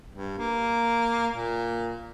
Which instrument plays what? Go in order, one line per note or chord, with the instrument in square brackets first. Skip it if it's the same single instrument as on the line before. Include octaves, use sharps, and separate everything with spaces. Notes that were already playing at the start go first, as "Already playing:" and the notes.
[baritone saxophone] G2
A#3
A#2